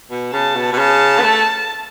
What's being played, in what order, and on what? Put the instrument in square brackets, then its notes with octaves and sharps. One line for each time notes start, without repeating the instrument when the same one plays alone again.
[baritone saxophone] B2
[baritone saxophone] C#3 [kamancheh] A5
[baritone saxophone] B2
B2
[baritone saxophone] C#3 [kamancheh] A5
[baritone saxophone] B3
A3